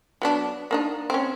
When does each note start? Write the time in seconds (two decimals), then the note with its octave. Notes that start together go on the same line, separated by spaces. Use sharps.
0.22 F#3 B3 D4
0.71 A#3 D4 D#4
1.10 C4 C#4